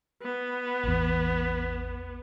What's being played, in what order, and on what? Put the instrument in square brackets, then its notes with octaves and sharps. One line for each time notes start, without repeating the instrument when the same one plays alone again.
[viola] B3
[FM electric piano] A1 E2